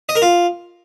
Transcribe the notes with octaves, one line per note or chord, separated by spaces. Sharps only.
D#5
A#4
F4